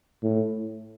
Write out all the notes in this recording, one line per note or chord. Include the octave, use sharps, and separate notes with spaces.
A2